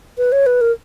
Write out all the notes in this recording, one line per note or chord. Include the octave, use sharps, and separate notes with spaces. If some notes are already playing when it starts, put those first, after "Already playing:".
B4
C#5
B4
A#4